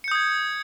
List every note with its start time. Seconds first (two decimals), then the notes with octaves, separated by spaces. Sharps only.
0.04 C#7
0.08 G6
0.11 D#6
0.15 G#6